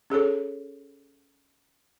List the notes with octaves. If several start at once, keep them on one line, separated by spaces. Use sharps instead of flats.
C#4 G#4 A4 C#5